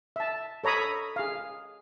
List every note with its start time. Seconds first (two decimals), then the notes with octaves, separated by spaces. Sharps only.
0.16 E5 A5
0.64 A4 C#5 A#5 B5 D#6
1.16 G#4 F5